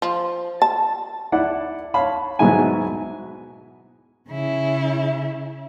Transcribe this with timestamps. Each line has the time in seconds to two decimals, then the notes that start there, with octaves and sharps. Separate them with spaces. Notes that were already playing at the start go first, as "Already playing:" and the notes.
0.02 F3
0.62 A5
1.32 E4 D5 F#5
1.94 C#5 F5 A5 B5
2.39 G#2 B2 F#3 G#3 E4 G#5
4.29 C#3 E4